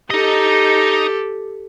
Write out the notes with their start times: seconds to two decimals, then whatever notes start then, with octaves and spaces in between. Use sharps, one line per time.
0.10 D#4 G4 A4 D#5